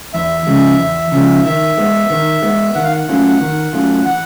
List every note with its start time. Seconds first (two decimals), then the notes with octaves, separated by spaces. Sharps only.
0.13 E2 E5
0.47 C#3 F3 G#3
0.79 E2
1.12 C#3 F3 G#3
1.45 D#3 E5
1.78 G#3 B3
2.10 D#3
2.42 G#3 B3
2.75 D#3 F#5
2.84 F5
2.92 F#5
3.09 F#3 A3 C#4 F4
3.40 D#3
3.73 F#3 A3 C#4 F4
4.06 E3 F#5